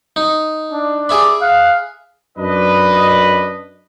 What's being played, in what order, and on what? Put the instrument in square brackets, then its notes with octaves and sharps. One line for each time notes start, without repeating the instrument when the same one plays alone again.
[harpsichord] D#4
[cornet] D4
[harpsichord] G#4 E5 B5 [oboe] D5
[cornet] F5 [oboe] F#5
[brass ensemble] F#2 D4 B4 D#5